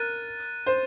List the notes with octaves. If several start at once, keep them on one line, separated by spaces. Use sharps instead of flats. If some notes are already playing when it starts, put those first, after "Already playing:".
Already playing: A#4 F#6 A6 D#7
C5